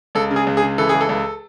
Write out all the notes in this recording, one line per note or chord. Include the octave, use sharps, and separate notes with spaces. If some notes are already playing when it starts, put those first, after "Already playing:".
C#2 A4
C#3
G#4
C#2
G#4
C#3
E3 A4
C#2 G#4
A4
C#2